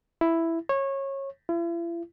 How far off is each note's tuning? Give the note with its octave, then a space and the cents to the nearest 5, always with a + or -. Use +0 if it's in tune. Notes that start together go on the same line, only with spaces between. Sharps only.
E4 +5
C#5 -20
E4 +45